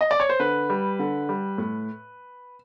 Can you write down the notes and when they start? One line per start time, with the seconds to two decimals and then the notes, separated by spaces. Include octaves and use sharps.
0.01 D#5
0.11 D5
0.20 C#5
0.29 C5
0.40 D3 B4
0.70 G3
0.99 D3
1.29 G3
1.58 A2